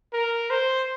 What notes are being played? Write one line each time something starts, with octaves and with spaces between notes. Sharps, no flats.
A#4
C5